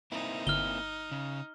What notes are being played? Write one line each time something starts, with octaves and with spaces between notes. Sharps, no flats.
A#3 C4 D#4 E4
G1 F6 G7
C#3